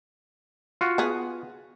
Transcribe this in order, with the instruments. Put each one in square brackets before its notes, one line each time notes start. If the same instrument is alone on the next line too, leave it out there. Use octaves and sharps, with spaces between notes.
[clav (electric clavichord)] F4 F#4
[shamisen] B3 G#4